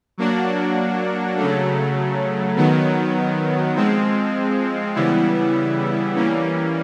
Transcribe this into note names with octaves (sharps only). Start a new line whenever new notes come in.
F#3 A#3 D4 F#4
C#3 F#3 A3
D#3 F#3 B3
F3 G#3 C4
C#3 E3 G3 B3 E4
E3 G3 A#3 C#4